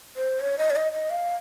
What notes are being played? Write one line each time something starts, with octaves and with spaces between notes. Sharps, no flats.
C5
C#5
D#5
C#5
D#5
D#5
F5